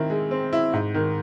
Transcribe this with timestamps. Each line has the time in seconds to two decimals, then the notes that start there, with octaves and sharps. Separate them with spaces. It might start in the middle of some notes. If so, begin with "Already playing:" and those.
Already playing: D#3 C4 E4
0.10 G#3
0.31 C4
0.53 E4
0.73 G#2
0.94 D#3